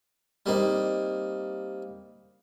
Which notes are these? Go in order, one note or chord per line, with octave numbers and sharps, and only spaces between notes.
G3 A#3 C4 D#4